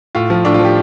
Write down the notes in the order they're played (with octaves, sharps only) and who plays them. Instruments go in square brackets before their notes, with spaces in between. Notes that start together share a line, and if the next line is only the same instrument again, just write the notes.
[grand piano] A2 F4
F3
A2 D4
F4
F3
G4